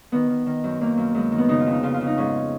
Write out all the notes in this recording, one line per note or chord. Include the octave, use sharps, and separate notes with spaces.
D#3 B3
D#3
D#3
F#2
F#2 A#3
F#2
F#2 G#3
D#3
B3
C#3 D#4
F4
F2
D#4
C#3 F4
F4
C#3
D#4
G#2 C#4